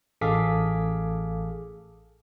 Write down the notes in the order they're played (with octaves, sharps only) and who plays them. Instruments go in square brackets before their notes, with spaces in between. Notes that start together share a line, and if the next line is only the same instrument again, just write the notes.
[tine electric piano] A1 G#4 A4 F5 D6 B6